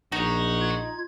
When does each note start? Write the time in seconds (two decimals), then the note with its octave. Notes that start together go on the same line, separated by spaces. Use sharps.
0.12 A#1 D#4 F#4 C#5
0.60 F4 G#6